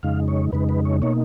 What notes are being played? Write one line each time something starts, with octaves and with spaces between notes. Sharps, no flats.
F2 C#3 G#3 D#4 F5
C#5
F2 C#3 G#3 D#4 B4
B4
C#5
B2 A#3 D#4 C#5